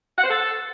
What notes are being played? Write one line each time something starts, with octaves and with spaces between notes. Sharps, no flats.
F#5
C5
A4